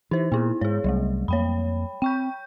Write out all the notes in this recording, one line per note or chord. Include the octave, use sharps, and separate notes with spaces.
E3 D#4 C5
A#2 B3 E4
G#2 G#4 C#5
C2 F#3 G3 A3
F2 A#3 C#5 G5 B5
C4 G5 C#6 G6